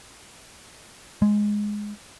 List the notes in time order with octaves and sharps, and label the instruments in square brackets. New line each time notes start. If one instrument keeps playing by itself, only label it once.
[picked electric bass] G#3